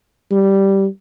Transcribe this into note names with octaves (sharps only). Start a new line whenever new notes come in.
G3